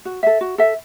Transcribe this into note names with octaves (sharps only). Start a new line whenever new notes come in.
F#4
A4 E5
F#4
A4 E5